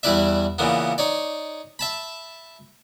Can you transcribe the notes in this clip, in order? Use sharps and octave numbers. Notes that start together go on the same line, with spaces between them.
E2 G3 E4 B4 D5 E5
A#2 C#3 E3 A#3 B3
D#4 C#5 D5
E5 A5 B5